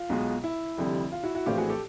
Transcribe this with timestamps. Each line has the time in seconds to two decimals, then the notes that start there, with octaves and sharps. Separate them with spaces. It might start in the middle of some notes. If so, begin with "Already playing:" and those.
Already playing: F4
0.09 B1 B2 G#3
0.44 E4
0.78 F1 F2 D3 G3
1.12 F4
1.24 E4 F#4
1.35 E4 F#4
1.46 A#1 A2 E3 A3 C4 F4 G4
1.58 F#4 G#4
1.70 G4 A4